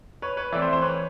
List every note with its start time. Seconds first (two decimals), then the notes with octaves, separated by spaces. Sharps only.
0.22 B4 C#5
0.37 B4 C#5
0.52 E3 A3 C4 D5 E5
0.62 C5
0.73 C5
0.82 B4 C#5